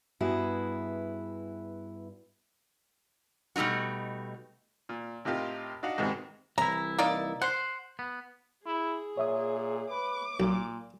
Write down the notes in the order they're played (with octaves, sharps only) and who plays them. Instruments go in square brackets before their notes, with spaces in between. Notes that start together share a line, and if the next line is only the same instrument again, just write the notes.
[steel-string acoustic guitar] G2 B3 E4 F#4 G#4
[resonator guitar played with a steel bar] B2 G3 A3 D#4 F#4
[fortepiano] A#2
A2 C3 D#4 F4 G4 A#4
D4 D#4 F#4 F5 F#5
G#2 C3 D#3 B3 F#4 G#4
[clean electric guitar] C2 E3 E4 [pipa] A#5
[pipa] A#3 D#4 D5
[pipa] C5 [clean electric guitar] F#5 C6
[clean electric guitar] B3
[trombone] E4 [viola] G#4
[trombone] A#2 [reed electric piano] C#5 E5 D#6
[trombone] B4 [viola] D6
[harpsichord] B1 [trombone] A#2